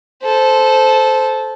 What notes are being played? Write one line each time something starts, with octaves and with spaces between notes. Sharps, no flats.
A4 C5